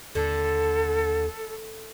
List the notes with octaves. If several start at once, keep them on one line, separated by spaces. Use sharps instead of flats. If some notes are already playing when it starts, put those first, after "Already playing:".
D#2 D3 A4